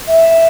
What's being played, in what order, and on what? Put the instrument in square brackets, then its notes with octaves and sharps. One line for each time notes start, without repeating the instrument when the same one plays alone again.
[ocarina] E5